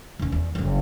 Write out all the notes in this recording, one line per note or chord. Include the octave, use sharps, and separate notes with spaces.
F1 C#4
E2
F#1 F2